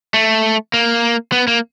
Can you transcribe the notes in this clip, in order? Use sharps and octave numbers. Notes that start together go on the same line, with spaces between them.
A3
A#3
B3
A#3